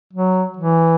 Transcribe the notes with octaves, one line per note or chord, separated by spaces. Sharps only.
F#3
E3